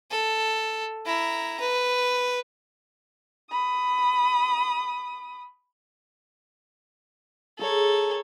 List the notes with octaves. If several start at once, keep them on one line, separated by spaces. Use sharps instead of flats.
A4
E4 A#5
B4
B5 D#6
G#4 A4 C#5 A#5